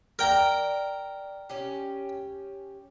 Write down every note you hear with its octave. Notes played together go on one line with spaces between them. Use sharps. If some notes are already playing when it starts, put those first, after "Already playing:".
A#4 D5 G5 A#5
C#4 G4